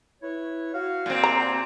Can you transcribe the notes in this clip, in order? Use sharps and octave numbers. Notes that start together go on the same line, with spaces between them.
E4 B4 C#5
F#4 F5
A#2 C4
A#5